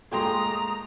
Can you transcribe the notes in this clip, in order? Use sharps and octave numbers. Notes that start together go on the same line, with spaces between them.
A#2 G#3 A3 G5 A#5 C6 D#6